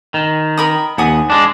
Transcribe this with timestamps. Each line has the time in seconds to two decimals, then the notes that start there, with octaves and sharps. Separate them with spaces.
0.14 D#3
0.58 A#4 B5 D#6
0.98 D#2 F#5 G#5 D#6
1.30 G#3 D4